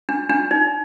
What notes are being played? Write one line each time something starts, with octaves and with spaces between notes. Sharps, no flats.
D4
D4
D#4